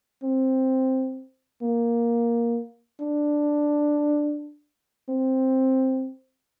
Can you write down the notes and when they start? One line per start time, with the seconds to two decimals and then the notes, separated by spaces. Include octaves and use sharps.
0.23 C4
1.62 A#3
3.00 D4
5.09 C4